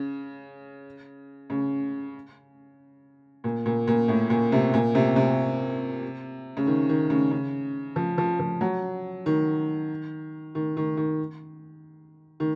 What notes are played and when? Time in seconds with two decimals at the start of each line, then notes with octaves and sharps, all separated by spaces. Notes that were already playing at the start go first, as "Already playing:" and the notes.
Already playing: C#3
1.50 C#3
3.44 A#2
3.66 A#2
3.87 A#2
4.08 A2
4.30 A#2
4.52 C3
4.74 A#2
4.95 C3
5.16 C3
6.57 C#3
6.67 D#3
6.89 D#3
7.10 C#3
7.31 C#3
7.96 F3
8.18 F3
8.40 F3
8.61 F#3
9.26 D#3
10.55 D#3
10.77 D#3
10.97 D#3
12.40 D#3